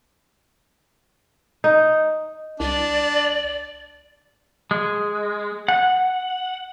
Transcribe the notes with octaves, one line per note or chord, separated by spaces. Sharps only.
D#4
C2 D4 D5
G#3
F#5